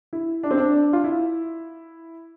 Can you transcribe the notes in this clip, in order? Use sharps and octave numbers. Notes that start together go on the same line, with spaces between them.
E4
D4
C4
D4
D4
F4
E4